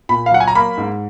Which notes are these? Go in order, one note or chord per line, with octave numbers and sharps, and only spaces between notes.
A#2 B5
F5
F#3 F#5
G#5
A#5
A#3 B5
G#2